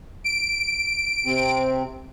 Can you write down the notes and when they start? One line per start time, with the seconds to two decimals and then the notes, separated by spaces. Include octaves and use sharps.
0.24 D7
1.26 C3 C4